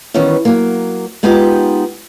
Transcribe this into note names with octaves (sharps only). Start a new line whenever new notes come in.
D#3 E3 G3 B3 C#4
F#3 A#3
G#3 B3 D#4 F4 G4